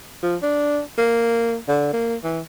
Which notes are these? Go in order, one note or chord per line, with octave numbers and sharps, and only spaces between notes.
F3
D4
A#3
D3
A#3
E3